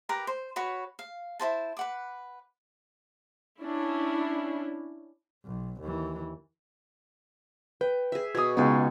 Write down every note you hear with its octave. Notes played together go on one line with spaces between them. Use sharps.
G4 A#4 B4 A#5
C5
F#4 B4 C#5 B5
F5
E4 F#4 C5 A5
B4 F#5 D6
C#4 D4 E4
B1
D#2 E3
B4 G5
G#4 E5
B2 G#4 D#6 G#6
C#2 B3 D#4 G#4